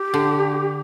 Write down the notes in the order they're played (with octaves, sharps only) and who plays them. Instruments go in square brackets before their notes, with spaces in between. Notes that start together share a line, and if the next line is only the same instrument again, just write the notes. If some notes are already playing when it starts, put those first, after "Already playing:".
Already playing: [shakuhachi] G4
[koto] D3